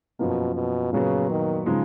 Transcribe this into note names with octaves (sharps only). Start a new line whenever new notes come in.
F#2 B2 F3 A#3
B2
A#2 C#3 F#3 B3
D#3
C#3 F3 G#3 D#4